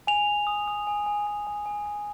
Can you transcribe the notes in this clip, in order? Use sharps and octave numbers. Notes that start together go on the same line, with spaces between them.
G#5 F7
G#5
D#6
D#6
G#5
G#5
G#5
G#5
G#5
G#5